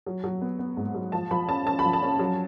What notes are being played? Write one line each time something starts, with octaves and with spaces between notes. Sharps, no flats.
F#3
F#3
B3
B3
G#2
F#3
F3 A5
F3 B5
C#4 A5
C#4 A5
B5
F3
A5
C#4
F#3